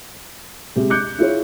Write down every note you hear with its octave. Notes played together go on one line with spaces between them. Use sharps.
C3 G#3 G4
D6 F#6 G6 C#7
E4 F4 G#4 C#5